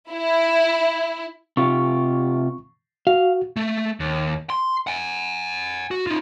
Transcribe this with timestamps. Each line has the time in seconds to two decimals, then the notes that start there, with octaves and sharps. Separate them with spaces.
0.11 E4
1.57 C3 F4 G4 C#6
3.07 F#4 F5
3.56 A3
4.00 D#2
4.50 C6
4.87 F#5 G#5
5.91 F#4
6.07 D#4 F4